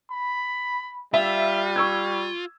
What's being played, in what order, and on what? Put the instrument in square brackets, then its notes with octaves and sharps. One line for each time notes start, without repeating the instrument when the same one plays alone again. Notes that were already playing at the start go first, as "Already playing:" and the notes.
[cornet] B5
[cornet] G3 [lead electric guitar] F4 [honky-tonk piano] E5
[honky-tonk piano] C#6 E6 G#6